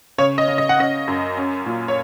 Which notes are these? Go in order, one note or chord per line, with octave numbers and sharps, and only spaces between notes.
C#3 C#5
D#5
C#3
D#5
F#5
C#4 D#5
F#2
C#4
A#2
C#5